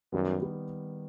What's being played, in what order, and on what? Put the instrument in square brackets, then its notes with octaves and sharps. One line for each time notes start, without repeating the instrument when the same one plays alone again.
[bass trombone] F#2 [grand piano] D#3 G3 B3
[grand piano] D#3 G3 B3